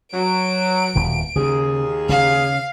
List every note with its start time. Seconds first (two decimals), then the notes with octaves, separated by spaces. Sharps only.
0.14 F#3 D7
0.96 D#1 B2
1.36 D#2 C#3 G#4
2.09 C#3 F5